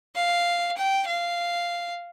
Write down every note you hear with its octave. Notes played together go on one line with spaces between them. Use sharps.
F5
G5
F5